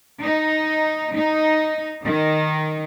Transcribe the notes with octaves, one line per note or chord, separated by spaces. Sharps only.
D#4
D#4
D#3